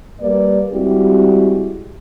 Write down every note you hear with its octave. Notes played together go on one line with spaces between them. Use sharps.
G3 A#3 B4 D5
G3 G#3 C4 E4 F#4 G4